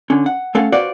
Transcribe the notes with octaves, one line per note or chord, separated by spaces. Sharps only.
D3 C#4
F#5
A3 C#4 A4 F5 F#5
F#4 B4 C5 D5 F5 F#5